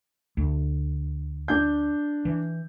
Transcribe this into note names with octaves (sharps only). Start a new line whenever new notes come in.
D2
D4 G6
E3